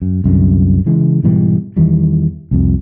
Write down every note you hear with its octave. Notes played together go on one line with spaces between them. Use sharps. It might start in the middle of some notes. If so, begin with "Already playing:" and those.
F#2
C2 F#2 D3
C#3 E3 G#3
G#2 B2 E3 G3
E2 D#3 E3 G3
C2 F2